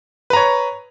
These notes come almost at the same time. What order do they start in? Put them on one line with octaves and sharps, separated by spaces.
B4 A#5 C#5